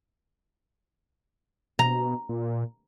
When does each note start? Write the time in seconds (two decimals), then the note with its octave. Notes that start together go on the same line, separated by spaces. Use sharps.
1.79 B2 A#5
2.29 A#2